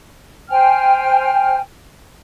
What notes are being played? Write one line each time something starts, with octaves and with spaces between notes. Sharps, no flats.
C5 G5 G#5 F6